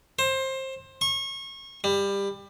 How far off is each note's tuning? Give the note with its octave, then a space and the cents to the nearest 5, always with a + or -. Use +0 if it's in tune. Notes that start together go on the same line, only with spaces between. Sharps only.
C5 +20
C#6 -30
G3 +20